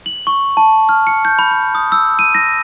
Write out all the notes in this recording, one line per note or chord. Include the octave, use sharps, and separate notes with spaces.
F#7
C#6
A5
F6
C#7
G6
B5
B5
D#6
E6
D#7
A#6